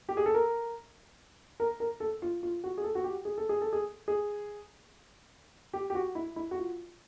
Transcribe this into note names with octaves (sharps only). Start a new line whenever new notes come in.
G4
G#4
A4
A#4
A#4
A#4
A4
F4
F4
F#4
G#4
A4
F#4
G4
G#4
A4
G#4
A4
G#4
G#4
G4
G4
F#4
E4
E4
F#4
F4